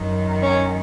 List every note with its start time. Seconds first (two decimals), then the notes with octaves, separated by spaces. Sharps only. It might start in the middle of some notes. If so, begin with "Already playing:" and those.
Already playing: F#2 D#3
0.42 C#4 C#5